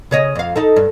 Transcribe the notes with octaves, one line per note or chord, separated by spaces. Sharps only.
C#3 C#5 D#5
F2 F5
D#4 A4
G2